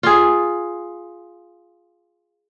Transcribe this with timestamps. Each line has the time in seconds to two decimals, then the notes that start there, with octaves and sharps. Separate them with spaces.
0.03 F4 G#4